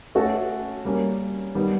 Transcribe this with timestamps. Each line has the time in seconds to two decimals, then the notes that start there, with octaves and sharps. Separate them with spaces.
0.15 A3 C#4 F#4 A4
0.85 G3 A#3 C#4
1.55 D#3 G3 B3